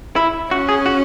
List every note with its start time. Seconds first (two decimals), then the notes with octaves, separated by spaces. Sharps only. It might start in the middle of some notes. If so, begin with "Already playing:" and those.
0.16 E4
0.51 C#4 F#4
0.69 G#4
0.86 F#4